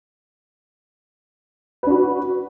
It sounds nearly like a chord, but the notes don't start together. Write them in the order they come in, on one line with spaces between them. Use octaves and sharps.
B4 D4 F#4